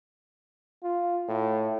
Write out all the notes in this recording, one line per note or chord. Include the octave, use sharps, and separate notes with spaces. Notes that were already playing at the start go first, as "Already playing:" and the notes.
F4
A2